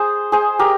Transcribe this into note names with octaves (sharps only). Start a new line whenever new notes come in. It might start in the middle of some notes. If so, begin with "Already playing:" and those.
Already playing: G#4 C5
G#4 C5
G4 A#4